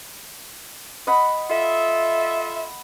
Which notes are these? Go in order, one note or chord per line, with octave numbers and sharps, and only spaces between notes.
D#5 F#5 B5
F4 A4 E5